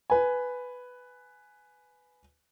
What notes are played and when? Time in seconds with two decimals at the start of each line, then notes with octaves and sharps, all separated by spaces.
0.10 B4 G#5